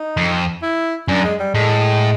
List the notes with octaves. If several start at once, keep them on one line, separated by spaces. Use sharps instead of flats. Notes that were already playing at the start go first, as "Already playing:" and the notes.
Already playing: D#4
F2
E4
F#2 D4
G#3
G3
A2 G#3